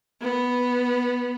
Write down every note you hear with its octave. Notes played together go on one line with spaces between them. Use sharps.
B3